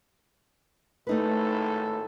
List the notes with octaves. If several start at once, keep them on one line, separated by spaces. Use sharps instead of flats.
G#1 A2 A3 D#4 A4 B4